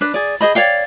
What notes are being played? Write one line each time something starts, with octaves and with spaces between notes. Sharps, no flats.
D4 B4
G#4 D5
G#4 C5 D#5 B5
C#5 D5 F5 G5